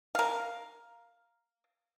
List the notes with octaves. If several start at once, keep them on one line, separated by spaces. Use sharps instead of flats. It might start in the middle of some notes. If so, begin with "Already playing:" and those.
A#4 F5